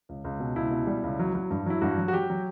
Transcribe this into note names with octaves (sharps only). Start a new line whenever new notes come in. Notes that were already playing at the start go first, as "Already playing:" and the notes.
C#2
C#2
B2
C#2 E4
B2
G3
C#2
F#3
F#3
G2
F#3 E4
G2 F#4
F#3
F#4
F#3 G4
F#3